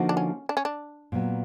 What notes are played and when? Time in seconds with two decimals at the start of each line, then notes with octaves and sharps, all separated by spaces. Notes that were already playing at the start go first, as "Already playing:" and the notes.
Already playing: D3 F3 A#3 D#4 F#4
0.09 D4
0.17 C#4
0.49 D4
0.57 C#4
0.65 D4
1.12 A#2 F#3 B3